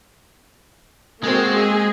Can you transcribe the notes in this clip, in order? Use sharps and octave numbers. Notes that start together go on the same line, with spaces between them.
G#3 A#3 C4 F#4
G#4